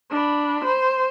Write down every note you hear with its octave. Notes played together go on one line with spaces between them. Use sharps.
D4 B5
C5